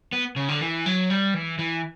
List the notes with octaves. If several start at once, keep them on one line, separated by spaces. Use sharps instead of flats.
B3
C#3
D3
E3
F#3
G3
E3
E3